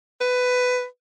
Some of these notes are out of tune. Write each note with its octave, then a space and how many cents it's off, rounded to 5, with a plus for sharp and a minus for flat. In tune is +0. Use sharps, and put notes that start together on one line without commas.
B4 +15